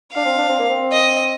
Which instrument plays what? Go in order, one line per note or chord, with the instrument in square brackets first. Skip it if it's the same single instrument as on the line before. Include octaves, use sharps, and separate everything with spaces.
[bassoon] D4 [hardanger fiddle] F5
[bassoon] C4
D4
C4
A#3
C4
[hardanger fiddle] D#5